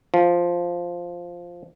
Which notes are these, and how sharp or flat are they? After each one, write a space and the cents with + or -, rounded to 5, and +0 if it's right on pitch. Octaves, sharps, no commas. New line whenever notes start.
F3 +0